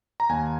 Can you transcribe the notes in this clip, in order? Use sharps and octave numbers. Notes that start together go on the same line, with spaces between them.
A#5
D#2 G#5